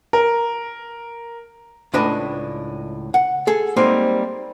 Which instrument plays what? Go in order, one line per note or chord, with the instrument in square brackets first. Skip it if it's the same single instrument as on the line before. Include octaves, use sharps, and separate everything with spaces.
[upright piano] A#4
[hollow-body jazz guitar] C#2 A2 D4 B4 D#5 B5
F#5
G#4 A4
G3 G#3 A#3 C4 D#4